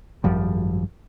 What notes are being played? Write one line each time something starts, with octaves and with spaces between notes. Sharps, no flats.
G#1 F#2 F3 G3